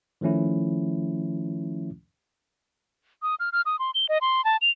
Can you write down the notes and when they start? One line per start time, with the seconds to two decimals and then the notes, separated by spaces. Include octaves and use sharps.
0.21 D#3 F3 A3 C#4 E4
3.22 D#6
3.40 F6
3.52 F6
3.66 D#6
3.79 C6
3.95 G7
4.09 D#5
4.21 C6
4.45 A5
4.61 F7